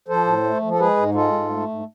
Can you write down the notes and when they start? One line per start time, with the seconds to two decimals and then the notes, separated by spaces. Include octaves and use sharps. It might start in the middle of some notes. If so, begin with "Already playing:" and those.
0.08 F3 A4 C5
0.26 A2
0.43 A3
0.62 F3
0.71 A4
0.79 G#3 G#4 B4
0.97 G#2
1.14 G#3 F4 A4
1.33 G#2
1.50 A3
1.68 G#2